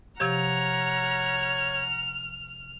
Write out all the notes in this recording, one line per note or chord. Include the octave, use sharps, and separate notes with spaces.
C3 F3 G4 C#5 F#5 A#5 F6